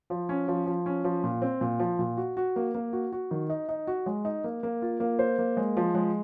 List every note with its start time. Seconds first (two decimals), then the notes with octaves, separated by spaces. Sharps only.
0.10 F3
0.29 C#4
0.48 F3
0.66 F3
0.86 C#4
1.04 F3
1.24 A#2
1.42 C4
1.61 A#2
1.80 F3
1.99 A#2
2.17 F#4
2.37 F#4
2.56 A#3
2.75 A#3
2.93 F#4
3.13 F#4
3.31 D#3
3.50 D#4
3.69 D#4
3.87 F#4
4.06 G#3
4.25 D#4
4.44 A#3
4.63 A#3
4.82 F4
5.00 A#3
5.19 C5
5.39 A#3
5.57 G#3
5.77 F3
5.95 G#3